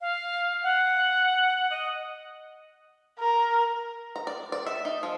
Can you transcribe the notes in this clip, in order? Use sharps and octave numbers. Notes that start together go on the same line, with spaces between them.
F5
F#5
D#5
A#4
A#5
D5
D5
E5
D#4
F3